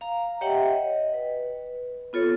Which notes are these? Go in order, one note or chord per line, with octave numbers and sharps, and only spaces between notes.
F5 A#5
G4 C#5 D#5 E5 F#5 G5
D#5
B4
B3 F4 A4 C#5